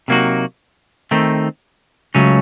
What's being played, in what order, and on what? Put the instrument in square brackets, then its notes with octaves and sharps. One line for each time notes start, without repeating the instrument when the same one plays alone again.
[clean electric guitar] C3 F#3 A#3 D#4 F#4
D#3 A3 C4 D#4
C#2 C#3 F#3 A3 C#4